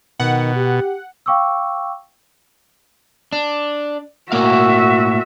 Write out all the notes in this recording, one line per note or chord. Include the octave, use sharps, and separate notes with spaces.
B2 D#3 F#5
G4
F5 G5 C#6 D6 E6
D4
A2 A#3 F#4 E5 F5